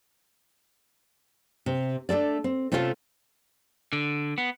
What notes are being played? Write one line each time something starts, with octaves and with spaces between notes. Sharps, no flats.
C3
A3 D4 A4 D5
C4
C3 A3 C#4 F4 G4 A4
D3
B3